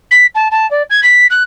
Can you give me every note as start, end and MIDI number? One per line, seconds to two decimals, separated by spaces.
0.11 0.26 95
0.35 0.48 81
0.51 0.69 81
0.71 0.83 74
0.90 1.01 92
1.03 1.27 95
1.30 1.43 90